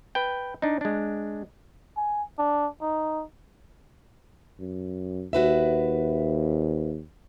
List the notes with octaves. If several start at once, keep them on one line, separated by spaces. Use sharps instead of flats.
B4 G5
D4 D#4
G#3 D4
G#5
D4
D#4
F#2
D#2 F#4 B4 E5